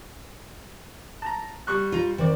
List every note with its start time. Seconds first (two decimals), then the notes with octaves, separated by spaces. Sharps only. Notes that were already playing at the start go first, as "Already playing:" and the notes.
1.22 A5 A#5
1.67 G3 C#6 F#6
1.92 F4 A#5
2.18 D#3 C4 D5